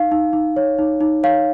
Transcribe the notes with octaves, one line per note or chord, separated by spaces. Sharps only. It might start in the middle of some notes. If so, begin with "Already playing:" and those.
Already playing: D#4 F5
D#4
D#4
C#5
D#4
D#4
C#5 F5